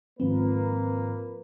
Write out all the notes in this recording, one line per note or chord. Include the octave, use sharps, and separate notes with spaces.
G#2 D#3 F3 A#3 C4 B4